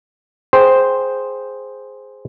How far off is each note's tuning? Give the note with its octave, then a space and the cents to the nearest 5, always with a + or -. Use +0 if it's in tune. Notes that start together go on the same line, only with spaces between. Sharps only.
G#4 +0 C5 +0 G5 +0